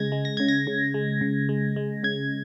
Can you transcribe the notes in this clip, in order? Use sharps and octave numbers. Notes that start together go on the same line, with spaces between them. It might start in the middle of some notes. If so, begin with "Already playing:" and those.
Already playing: C#3 G#3 G#6 A#6
G#3
A#6
C#3 G#6
A#6
C#3
G#3
C#3
G#3
G#3
C#3 G#6